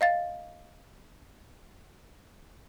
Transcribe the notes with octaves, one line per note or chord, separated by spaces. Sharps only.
D#5 F5 A6